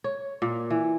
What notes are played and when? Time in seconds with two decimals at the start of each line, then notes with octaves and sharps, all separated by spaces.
0.04 C#5
0.42 A#2
0.70 E3